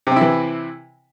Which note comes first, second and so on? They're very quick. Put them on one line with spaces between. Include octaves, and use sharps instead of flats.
C3 C4 E4 E3